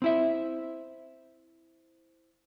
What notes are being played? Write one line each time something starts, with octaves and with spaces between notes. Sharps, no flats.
C4 E4 E5